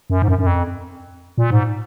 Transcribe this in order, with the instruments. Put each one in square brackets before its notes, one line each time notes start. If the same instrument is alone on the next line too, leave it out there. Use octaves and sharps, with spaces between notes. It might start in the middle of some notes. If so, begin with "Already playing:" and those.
[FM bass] F#2
G#2
F#2
F#2
F2
A#2
G#2